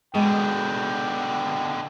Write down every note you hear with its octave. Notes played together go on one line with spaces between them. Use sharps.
B2 D3 G#3 G5